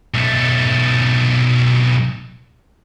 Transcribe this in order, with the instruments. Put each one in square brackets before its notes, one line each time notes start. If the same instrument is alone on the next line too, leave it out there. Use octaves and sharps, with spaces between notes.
[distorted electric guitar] B1 A3